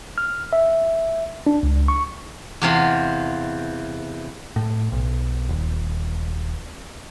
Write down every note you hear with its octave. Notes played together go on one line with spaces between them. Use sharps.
F6
E5
D4
C#2
C#6
E2 C3 F4 C6
A2
B1
D#1